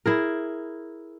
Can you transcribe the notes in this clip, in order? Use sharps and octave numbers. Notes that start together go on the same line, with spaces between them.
E4 G#4 A#4